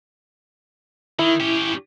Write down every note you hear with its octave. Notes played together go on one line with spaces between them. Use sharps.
D#3 E4
C#4 G4